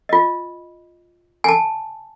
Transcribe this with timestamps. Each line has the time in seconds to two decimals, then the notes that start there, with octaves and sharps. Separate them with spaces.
0.09 F4 D#5
1.44 G#5 A5